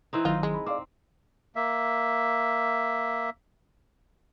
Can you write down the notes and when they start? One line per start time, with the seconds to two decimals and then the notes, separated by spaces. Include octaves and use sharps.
0.13 E3 C4 D#4
0.25 G1 D#3 F#3 F4 D#5 G5
0.43 G#3
0.54 B5
0.66 C4 D5 F5 D6
1.56 A#3 E5